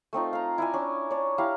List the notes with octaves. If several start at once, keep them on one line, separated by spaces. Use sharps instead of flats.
A3 C4 D#4 F4
F5 A#5
E4 D5 G#5
C#4 D4
D4 C#5
E4 G4 F5 A#5